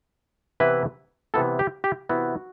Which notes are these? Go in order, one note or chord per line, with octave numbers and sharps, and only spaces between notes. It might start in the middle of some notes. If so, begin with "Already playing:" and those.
C3 E3 B3 E4 B4
C3 E3 B3 E4 A4
G4
G4
C3 E3 B3 E4 F#4